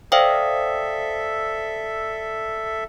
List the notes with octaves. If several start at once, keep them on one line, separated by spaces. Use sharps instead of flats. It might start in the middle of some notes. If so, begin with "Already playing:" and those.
A4 C5 D5 E5 F5 G5 D#6